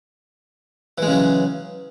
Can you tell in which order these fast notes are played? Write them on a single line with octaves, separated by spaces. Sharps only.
E3 G#3 C#3 F#3